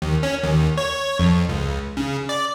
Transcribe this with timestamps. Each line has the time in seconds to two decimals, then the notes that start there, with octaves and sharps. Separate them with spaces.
0.02 D#2
0.23 C#4
0.43 D#2
0.77 C#5
1.19 F2
1.49 C#2
1.97 C#3
2.29 D5